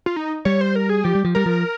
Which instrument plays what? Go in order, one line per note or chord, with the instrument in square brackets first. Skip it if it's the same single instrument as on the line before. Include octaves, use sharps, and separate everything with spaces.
[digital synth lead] F4
D#4
[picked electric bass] G3 [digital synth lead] C#5
[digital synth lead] C5
A#4
G#4
[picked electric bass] F3 [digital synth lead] G4
[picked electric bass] G3
F3
[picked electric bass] G3 [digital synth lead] A#4
[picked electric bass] F3